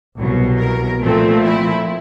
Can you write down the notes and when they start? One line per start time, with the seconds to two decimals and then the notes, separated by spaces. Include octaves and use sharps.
0.17 C2 B2 F#3
0.59 A#4
1.01 A#2 F3 A3 C4 A4
1.43 E4